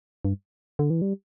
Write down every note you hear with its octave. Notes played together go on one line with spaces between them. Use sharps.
G2
D3
E3
G3